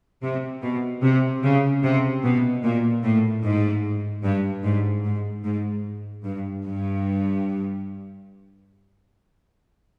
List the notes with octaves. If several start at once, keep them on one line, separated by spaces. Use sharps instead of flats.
C3
B2
C3
C#3
C3
B2
A#2
A2
G#2
G2
G#2
G#2
G#2
G2
G2